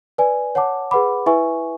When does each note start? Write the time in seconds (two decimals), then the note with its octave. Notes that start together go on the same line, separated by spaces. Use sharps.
0.18 B4 D5 G#5
0.55 C#5 F#5 A5 D6
0.91 G#4 B4 F#5 B5 D6
1.26 E4 B4 E5 G#5 C#6